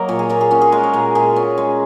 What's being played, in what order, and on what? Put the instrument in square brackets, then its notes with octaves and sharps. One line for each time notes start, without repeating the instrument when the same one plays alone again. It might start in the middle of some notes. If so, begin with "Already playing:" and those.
Already playing: [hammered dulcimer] F#3 A#3 A#4 D#5
A#2 C#5
G#4
A#2 A#4
G#4
C#4 F#4
G#4
G#3 A#4
C#5
A#2 A#4
A#2 G#4
C#4
G#3